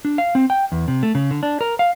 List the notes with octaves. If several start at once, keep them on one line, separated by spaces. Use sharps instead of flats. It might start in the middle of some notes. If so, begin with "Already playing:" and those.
D4
F5
C4
G5
E2
C3
A3
C#3
D3
D4
A#4
F5